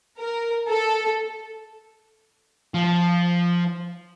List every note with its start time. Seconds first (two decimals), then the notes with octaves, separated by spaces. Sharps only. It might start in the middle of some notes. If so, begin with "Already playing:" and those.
0.19 A#4
0.68 A4
2.74 F3